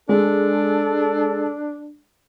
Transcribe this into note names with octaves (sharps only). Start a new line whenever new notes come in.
G#3 D4 A4